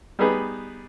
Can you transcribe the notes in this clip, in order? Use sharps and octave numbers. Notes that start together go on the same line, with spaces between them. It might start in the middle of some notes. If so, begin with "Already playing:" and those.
G3 B3 D#4 G#4 B4